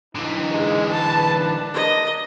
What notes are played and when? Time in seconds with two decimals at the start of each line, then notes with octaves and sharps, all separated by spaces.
0.15 D3 E3 D#4
0.51 G#3
0.92 B4 A5
1.37 D4
1.74 A#4 D#5